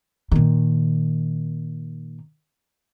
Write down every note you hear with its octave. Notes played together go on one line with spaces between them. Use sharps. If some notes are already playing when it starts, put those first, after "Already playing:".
A#2 D#3